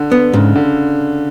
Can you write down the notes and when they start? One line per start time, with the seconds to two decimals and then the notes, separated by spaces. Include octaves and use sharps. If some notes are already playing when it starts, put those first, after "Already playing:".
Already playing: D3
0.12 B3
0.33 G#2 C#3
0.56 D3